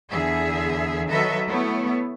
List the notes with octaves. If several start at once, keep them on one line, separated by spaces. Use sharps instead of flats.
E2 D3 G#4 E5
D#3 F#3 A4 B4 D#5 E5
A3 B3 E4 C#5